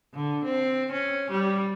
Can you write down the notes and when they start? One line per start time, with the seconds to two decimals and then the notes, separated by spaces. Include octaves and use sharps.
0.14 D3
0.45 C4
0.92 C#4
1.31 G3